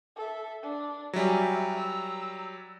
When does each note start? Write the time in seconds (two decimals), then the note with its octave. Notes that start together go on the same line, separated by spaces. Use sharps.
0.16 A4 E5
0.63 D4
1.13 F#3 G3 E5 G#5
1.77 A#5 E6